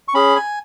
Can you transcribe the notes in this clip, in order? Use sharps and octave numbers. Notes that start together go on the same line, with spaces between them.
C#6
C#4 G#4 B5
G#5